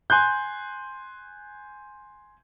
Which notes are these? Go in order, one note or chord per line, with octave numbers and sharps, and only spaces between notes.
G#5 C6 F#6 G6